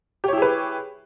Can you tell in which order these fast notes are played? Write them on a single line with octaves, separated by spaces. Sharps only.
G4 C#5 E4 G#4 B4